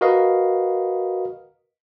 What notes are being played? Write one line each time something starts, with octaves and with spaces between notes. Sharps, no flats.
F#4 A#4 B4 D#5 F5